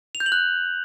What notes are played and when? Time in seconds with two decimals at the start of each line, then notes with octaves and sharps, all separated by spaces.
0.15 F7
0.20 G6
0.26 F#7
0.32 F#6